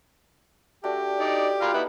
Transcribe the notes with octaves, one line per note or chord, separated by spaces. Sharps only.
A3 D4 F#4 G4
D#4 D5
F4 B4 F5 A#5
B3 D#4 E4